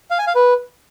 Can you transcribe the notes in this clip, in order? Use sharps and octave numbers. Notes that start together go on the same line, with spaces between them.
F5
G#5
F5
B4